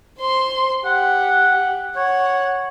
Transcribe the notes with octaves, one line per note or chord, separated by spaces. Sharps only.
C5 C6
G4 F#5
C#5 F#5